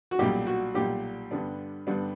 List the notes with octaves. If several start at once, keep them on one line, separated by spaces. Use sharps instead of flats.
F#4
B1 A#2 G3 G4
F#4
B1 A#2 G3 G4
G2 D3 G3 B3 D4
G2 D3 G3 B3 D4